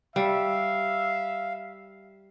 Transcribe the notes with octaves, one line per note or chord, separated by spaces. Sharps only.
G3 E5 F5